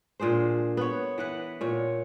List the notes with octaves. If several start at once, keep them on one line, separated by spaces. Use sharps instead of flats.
A#2 D4 G#4 C5
B3 C#5
E3 B4 F#5
A#2 C#5